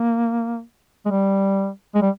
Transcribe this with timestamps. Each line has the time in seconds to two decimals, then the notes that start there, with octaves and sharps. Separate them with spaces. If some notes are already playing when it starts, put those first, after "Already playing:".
Already playing: A#3
1.06 G#3
1.11 G3
1.95 G#3
2.02 G3